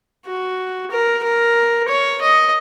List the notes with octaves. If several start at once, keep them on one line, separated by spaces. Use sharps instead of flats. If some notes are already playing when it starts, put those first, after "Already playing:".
F#4
A#4
A#4
C#5
D#5